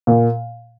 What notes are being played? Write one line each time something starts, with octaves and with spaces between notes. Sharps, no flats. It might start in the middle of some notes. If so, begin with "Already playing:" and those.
A#2